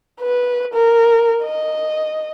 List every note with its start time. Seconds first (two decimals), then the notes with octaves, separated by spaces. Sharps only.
0.21 B4
0.74 A#4
1.44 D#5